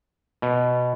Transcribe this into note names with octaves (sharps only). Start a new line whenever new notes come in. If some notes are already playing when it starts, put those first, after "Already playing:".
B2